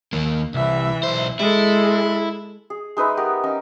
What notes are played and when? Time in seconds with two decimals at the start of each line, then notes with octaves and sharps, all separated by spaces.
0.13 D#2 A#3
0.54 C2 E3 E5
1.03 B1 C5
1.39 G#3 E4 A4
2.70 G#4
2.97 G#3 D#4 B4 E5
3.17 B3 G4 A#4
3.44 C#4 D#4 A#5